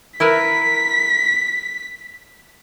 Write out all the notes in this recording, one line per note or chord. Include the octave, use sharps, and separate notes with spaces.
E4 A#4 B4 B6